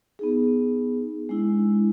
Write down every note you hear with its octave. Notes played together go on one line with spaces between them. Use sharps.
B3 D#4 G#4
G#3 D4 E4